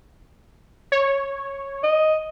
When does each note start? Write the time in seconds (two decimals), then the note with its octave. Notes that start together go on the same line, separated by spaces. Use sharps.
0.92 C#5
1.83 D#5